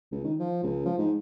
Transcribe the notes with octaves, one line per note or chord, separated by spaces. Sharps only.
C#2
D#3
F3
C#2
F3
G#2